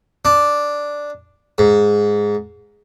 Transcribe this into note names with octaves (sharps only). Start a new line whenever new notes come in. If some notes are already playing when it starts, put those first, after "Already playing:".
D4
G#2